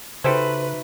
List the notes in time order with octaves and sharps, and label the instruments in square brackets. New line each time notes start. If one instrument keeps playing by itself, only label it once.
[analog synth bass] C#3 [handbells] D#4 F#4 E5 [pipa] G4 A4 C5 [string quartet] B4